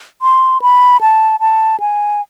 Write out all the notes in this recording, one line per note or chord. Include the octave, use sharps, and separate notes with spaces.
C6
B5
A5
A5
G#5